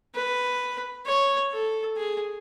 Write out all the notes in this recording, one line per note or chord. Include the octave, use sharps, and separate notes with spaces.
B4
C#5
A4
G#4